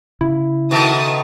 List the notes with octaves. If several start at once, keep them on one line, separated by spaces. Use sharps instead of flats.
C#3 E4
B2 D#3 A3 A5 D#6